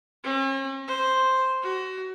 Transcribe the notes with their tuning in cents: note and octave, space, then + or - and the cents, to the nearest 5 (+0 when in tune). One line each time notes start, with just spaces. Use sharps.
C#4 -45
C5 +0
F#4 +25